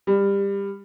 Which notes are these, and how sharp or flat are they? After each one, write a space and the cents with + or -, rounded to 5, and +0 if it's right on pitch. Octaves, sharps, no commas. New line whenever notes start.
G3 +20